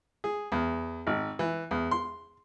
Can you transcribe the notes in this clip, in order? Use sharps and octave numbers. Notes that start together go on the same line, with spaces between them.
G#4
E2
G#1
E3
E2
C6